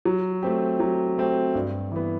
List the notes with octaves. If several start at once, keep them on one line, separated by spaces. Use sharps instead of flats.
F#3
A3 C4 G4
F#3
A3 C4 G4
G2
E3 B3